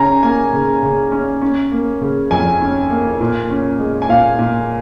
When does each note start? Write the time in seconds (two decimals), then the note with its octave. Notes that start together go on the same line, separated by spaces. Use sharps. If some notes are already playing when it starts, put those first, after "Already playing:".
Already playing: C#3 C#4 G#5 A#5
0.22 A#3 G#5
0.53 C#3
0.83 C#3
1.12 C#4
1.42 C#4
1.72 A#3
2.01 C#3
2.31 F2 G#5
2.61 C#4
2.90 A#3
3.20 A#2
3.50 C#4
3.80 G#3
4.02 G#5
4.09 A#2 F5
4.38 A#2